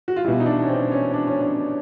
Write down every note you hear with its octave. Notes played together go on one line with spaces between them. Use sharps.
F#4
F4
B2 G3 E4
D#4
D4
C#4
C4
C#4
D4
C#4
D4